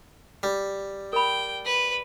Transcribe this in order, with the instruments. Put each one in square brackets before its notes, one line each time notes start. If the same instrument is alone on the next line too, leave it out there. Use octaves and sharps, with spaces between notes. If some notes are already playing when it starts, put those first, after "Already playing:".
[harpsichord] G3
[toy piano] A#4 B5 [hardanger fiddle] G5
[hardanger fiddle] B4